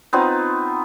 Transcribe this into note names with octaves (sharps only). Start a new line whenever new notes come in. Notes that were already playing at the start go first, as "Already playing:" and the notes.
B3 C4 D#4 F4